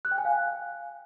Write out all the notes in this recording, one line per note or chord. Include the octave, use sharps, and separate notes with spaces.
F#6
G5
G#5
F5